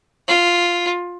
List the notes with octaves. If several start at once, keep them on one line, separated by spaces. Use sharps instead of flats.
F4